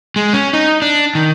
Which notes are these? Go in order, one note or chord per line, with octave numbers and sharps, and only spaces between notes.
G#3
C#4
D#4
D4
D#3